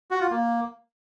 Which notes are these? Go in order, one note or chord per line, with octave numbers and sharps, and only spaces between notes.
F#4
F4
A#3